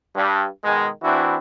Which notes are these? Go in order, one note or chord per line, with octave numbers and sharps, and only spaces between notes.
G2
B2 D#3 G#3
E3 C4 D4 E4 F#4